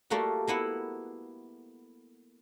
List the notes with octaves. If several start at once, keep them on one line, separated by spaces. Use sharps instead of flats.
G3 A3 A#3 F4 F#4
A#3 B3 E4 F#5